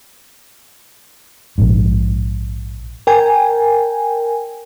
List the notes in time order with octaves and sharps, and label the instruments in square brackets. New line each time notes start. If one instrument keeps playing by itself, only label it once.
[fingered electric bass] A#1 G#2
[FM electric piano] A#4 G5 G#5